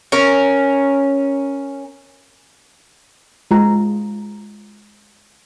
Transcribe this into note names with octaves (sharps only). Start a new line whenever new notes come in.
C#4 A#4
G#3 F4 A#5